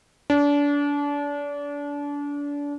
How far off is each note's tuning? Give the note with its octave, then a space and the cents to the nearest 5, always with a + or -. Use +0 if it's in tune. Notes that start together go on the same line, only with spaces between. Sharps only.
D4 -30